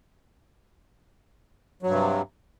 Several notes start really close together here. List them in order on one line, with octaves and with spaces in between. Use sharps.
F#3 G2 C3